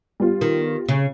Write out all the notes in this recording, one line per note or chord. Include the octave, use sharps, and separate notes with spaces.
G3 B3 F4
D#3
C#3